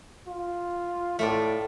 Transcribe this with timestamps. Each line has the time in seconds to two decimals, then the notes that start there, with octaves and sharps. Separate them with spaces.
0.28 F4
1.19 A2 A3 F4 D5